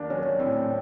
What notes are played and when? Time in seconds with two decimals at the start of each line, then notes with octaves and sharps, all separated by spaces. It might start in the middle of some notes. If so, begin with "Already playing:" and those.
Already playing: D#2 D#3 D4
0.10 F#3 C#4
0.39 A2 C4